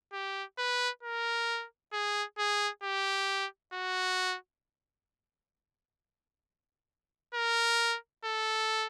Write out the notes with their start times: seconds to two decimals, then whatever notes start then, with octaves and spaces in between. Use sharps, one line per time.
0.13 G4
0.58 B4
1.03 A#4
1.93 G#4
2.39 G#4
2.84 G4
3.73 F#4
7.34 A#4
8.25 A4